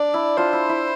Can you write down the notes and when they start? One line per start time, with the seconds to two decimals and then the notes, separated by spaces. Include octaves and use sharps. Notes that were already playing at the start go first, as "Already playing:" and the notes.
Already playing: D4 D5
0.14 E4
0.37 D4 F4 C5
0.53 E4
0.69 E4